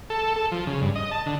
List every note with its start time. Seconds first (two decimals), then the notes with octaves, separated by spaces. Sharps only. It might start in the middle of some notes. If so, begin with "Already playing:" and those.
0.10 A4
0.36 A4
0.52 F3
0.67 C#3
0.81 G2
0.95 D#5
1.11 A5
1.26 D3